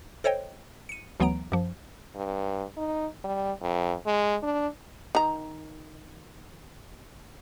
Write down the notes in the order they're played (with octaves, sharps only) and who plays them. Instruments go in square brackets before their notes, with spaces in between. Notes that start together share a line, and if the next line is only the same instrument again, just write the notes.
[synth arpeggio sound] A4 C5 C#5 D#5 G5
C#7 D#7
D2 E3 F#3 B3 A#5 D7
F#2 F3
[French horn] G2
D#4
G3
F2
G#3
D4
[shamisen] D#3 A#5